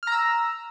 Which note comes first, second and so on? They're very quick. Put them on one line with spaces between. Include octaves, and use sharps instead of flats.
F6 A#5 E6